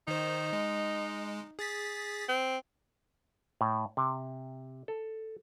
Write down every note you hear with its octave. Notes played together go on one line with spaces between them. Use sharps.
D#3 D#4 C5
G#3
G#4 A6 B6
C4
A2
C3
A4